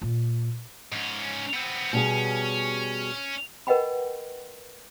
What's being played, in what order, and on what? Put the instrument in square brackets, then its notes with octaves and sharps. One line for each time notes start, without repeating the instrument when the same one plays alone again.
[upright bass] A#2
[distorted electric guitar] G#2 C#4
B3 C4
[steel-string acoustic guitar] B2 G3 G#4 [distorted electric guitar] C#4
[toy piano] A#4 B4 D#5 F#5 G5 B5